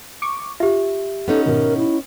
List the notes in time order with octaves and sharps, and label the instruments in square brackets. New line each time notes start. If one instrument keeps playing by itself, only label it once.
[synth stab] C#6 D6
[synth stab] F4 [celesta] G4 E5
[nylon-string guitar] B3 C#4 D#4 [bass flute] A4
[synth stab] G#2 B2 D#3 [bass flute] A#4
[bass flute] E4